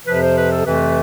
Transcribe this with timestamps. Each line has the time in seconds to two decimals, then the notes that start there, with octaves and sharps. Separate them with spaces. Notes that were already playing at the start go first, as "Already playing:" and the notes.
0.06 F2 C3 F3 B4
0.21 C5
0.36 B4
0.51 A4
0.66 F2 C3 E3 A3 B4
0.81 B4